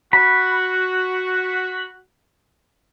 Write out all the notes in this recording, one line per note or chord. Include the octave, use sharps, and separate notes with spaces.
F#4 B5